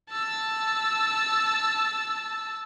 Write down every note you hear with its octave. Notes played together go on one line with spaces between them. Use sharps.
A5 E6